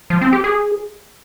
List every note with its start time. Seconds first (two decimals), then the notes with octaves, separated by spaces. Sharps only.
0.10 F3
0.21 C4
0.33 G4
0.44 G#4